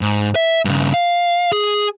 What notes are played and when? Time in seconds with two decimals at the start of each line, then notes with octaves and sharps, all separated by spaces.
0.01 G#2
0.36 E5
0.65 G2 C#3
0.94 F5
1.52 G#4